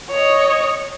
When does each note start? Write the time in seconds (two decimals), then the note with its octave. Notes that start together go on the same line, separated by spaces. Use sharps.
0.11 C#5 D#5